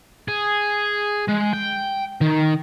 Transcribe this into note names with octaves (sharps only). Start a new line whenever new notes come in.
G#4
G#3
G5
D#3